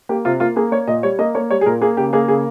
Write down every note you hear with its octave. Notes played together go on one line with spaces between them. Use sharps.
A#3 G4
C3 F4
A#3 F4
A#3 G#4
A#3 C#5
A#2 D#5
G3 C#5
A#3 D#5
A#3 C#5
G3 C#5
G#4
A#2 A#4
A#3 G#4
C#3 G4
A#3 G#4
C#3 G#4